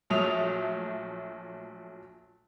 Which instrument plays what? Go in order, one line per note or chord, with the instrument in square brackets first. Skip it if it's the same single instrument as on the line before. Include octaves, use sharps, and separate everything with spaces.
[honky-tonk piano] A#1 F#3 A3 D#6 F7